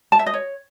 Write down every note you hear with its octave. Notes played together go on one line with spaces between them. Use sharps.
A5
E5
D#5
C#5